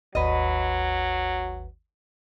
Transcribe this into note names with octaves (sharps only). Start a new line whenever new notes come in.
G#1 D#2 F#3 B4 D#5